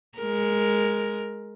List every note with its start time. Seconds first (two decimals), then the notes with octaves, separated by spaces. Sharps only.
0.18 G#3 A#4